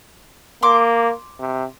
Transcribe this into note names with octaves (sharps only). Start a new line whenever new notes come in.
A#3 C6 D6
C3